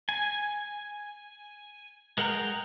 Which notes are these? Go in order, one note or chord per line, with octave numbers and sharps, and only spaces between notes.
G#5
G#3 A#4 F#5 G5 A#5